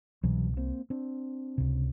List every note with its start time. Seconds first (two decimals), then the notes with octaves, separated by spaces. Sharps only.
0.23 C2 B2 E3 F#3
0.57 A#3 C4
0.90 C4 D4
1.58 C#2 C3